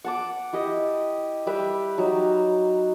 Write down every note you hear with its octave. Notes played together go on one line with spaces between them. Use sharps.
F#5 A5 D6
E4 G4 D#5
G3 B4 E5 G5
F#3 D#4